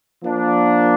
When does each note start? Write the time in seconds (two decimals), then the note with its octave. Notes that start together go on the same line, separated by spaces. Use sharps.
0.23 F3 A#3 D4